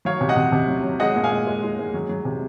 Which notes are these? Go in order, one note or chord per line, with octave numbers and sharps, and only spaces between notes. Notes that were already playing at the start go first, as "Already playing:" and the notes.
F#3 C#5 F5
C3
D#5 F#5
C3
C3
F#3
F#3
G#3 D#5 F#5
A#2
F5 G#5
G#3
G#3
G#3
G#3
F#3
F#3
C3